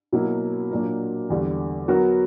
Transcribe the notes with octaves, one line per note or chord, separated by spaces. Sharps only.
B2 F#3 A#3 E4
A#2 F#3 A#3 D4 A#4
E2 D3 G3
F#3 B3 F#4 A#4